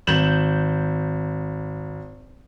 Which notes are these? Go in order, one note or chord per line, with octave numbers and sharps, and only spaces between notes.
G#1 G6 E7 F#7